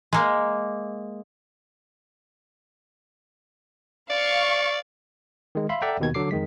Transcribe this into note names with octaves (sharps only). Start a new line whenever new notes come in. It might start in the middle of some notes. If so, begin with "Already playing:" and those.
G#3 A#3
D5 F5 C#6
D#3 G#3
E5 F5 B5 C6
A4 D5 E5 F#5 G5 A#5
D#2 B2 D#3 G#6
D3 F#3 A4 D6 C7
F2 D#3 G#3 B6